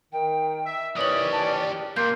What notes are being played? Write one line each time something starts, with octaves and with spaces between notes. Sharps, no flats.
D#3 G5
E5
D#3 E3 C#4 G4 D5 D#5 D#6 F#7
A5
A#2 A#3 C6 G6 C7